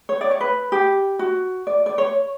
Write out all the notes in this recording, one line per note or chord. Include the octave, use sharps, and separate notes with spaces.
C#5
D5
C#5
B4
G4
F#4
D5
D5
C#5